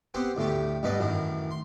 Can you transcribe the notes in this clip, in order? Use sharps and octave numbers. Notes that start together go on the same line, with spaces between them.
B3 C4 G4 C5 F#5
D2 A2 A3 G4
B1 G2 B2 B4 D5 D#5
F#2 A2 D#3 E3
C6